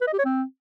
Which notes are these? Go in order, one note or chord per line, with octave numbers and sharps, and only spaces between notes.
B4
D#5
G4
C#5
C4